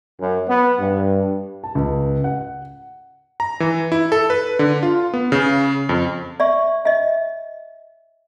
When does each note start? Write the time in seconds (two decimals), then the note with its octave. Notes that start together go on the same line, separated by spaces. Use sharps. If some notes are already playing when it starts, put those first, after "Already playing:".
0.20 F#2
0.48 B3
0.80 G2
1.64 A5
1.75 C#2
2.24 F#5
3.40 A#5
3.60 E3
3.92 E4
4.12 A4
4.30 B4
4.59 D3
4.83 F4
5.14 B3
5.32 C#3
5.89 F2
6.40 D5 E5 C#6
6.85 D#5 E5